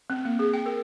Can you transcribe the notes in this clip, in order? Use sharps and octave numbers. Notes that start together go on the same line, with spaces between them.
C4
A#3
G#4
G5
A#4